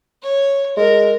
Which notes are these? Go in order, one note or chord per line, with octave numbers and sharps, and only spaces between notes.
C#5
G#3 A#4